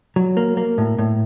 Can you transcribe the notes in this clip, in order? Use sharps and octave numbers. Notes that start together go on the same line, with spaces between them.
F#3
A#3
A#3
A2
A2